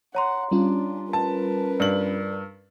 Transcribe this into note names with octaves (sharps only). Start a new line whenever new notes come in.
C#5 F#5 A#5 C6
G3 C#4 D4 F4
A#4 B4 A5
G2 D5 F#7